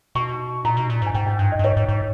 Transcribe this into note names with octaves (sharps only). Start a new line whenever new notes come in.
B2 C#6
A#2 A#5
B2
A#2
G#2
G#5
G#2 G5
G5
G2
D#5
G2
G#2 C#5
G#2
G#2